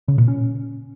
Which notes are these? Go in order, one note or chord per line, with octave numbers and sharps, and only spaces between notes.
C#3
A#2
C#4